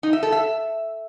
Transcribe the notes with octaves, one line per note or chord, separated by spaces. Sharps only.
D#4
E5
A4
E5